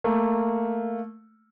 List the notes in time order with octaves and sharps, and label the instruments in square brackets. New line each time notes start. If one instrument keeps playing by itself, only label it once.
[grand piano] A3 A#3